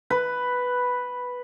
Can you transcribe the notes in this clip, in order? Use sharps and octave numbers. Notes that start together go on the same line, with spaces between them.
B4